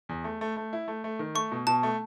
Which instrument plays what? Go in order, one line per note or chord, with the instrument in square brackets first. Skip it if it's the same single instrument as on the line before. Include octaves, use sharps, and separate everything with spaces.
[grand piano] E2
A3
A3
A3
E4
A3
A3
D#3
[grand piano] A3 [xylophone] C#6
[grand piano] B2
[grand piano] B2 [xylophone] A5
[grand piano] A3